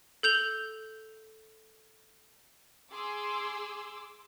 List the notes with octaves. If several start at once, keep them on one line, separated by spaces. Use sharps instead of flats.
A4 G6 F7 G7
G#4 C6 D6 E6